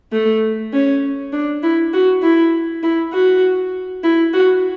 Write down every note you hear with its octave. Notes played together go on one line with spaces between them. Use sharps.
A3
C#4
D4
E4
F#4
E4
E4
F#4
E4
F#4